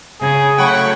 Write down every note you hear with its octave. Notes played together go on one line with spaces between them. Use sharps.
C#3 G#4
F#3 A3 F#5 G5 B5 C#6